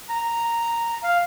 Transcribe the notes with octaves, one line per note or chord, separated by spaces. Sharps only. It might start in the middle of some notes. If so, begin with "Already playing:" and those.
A#5
F5